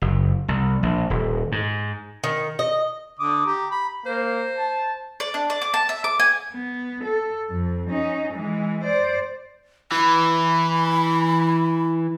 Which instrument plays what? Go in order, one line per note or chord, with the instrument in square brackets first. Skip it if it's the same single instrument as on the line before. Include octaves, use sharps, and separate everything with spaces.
[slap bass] F#1
C2
A#1
D#1
G#2
[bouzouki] D#3
D#5
[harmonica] D3 D6 D#6
G4 A#5
B5
[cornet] A#3 [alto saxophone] C5
[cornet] A5
[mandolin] D5
D4
D5
D6
A5
E5
D6
G#5
[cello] B3
A4
F2
C#4 D#4
E3 G#3
C5 D5
[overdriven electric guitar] E3 [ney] B5